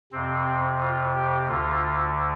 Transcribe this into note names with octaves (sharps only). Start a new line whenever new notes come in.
F2 C3 C4
F4
G4
D2 D3 F4